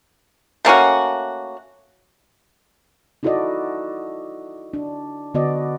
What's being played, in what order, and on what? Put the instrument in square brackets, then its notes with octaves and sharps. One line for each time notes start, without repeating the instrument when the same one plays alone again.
[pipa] A3 A#3 C#4 F#4
[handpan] D#4 E4 F#4 A4 D5 D#5
D4
D3 B3 F#4 D5 D#5